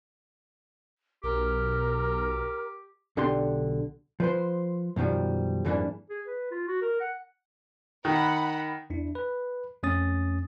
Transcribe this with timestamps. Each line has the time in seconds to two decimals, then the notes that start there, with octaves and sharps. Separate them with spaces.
1.24 B1 G4 A#4
3.17 B1 D3 D4 G4 C6
4.20 F3 B4 C5
4.96 F#2 B2 D#3 F3 G3
5.65 F2 G#2 E3 G3 A#3 D4
6.10 G#4
6.27 B4
6.51 F4
6.67 F#4
6.82 A#4
7.00 F#5
8.05 D#3 F#5 B5
8.90 E2 D4 E4
9.15 B4
9.83 F2 A3 C#4 D#6 A6